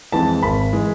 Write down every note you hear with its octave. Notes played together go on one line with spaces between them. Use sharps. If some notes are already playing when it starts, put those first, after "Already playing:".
F2 E3 G#3 A5
G#1 B5
E3 G#3